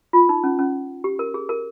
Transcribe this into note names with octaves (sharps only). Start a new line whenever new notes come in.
F4
D#4
C#4
C#4
G4
A#4
G#4
A#4